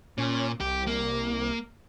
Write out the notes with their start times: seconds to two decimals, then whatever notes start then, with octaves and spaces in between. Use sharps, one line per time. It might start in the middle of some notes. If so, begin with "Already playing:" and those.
0.18 A#2 C#4
0.60 C2 G4
0.87 A#3